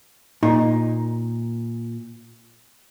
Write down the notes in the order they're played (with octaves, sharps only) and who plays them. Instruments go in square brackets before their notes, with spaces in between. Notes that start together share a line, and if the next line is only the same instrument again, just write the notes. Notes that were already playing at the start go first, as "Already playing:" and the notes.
[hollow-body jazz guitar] A#2 [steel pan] D#4